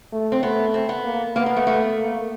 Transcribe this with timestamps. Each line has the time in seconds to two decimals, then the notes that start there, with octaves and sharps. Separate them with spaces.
0.12 A3
0.32 C4
0.42 A3 B3
0.74 C4
0.89 B3
1.04 A#3
1.36 A#3 B3
1.46 A#3
1.56 A3
1.67 A3
1.98 A#3